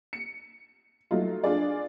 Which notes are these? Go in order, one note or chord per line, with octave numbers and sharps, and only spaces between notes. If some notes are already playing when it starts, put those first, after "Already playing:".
C#7
F#3 A3 D#4 F4
D4 F4 G#4 D5